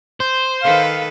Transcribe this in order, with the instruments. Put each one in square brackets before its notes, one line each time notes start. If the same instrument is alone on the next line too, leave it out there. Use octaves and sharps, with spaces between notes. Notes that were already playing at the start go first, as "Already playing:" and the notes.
[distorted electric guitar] C5
[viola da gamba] D#3 A4 B4 [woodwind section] F5